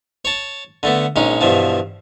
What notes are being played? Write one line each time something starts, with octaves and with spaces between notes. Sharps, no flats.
C#5 A5
D3 A3 B3
A#1 G#3 C#4 D#4
G2 B2 E3 F3